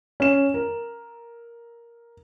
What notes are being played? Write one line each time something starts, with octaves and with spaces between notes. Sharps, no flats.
C#4 E7
A#4